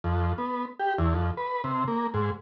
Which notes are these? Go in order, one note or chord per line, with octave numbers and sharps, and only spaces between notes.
F2
B3
G4
E2
F2
B4
C3
A#3
G#2